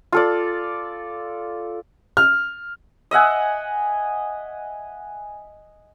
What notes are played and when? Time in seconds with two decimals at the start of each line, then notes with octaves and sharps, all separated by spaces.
0.13 F4 A4 D5
2.17 F6
3.11 D#5 E5 F#5 G#5